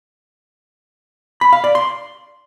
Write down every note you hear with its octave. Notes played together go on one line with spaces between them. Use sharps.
B5
F5
D5
C6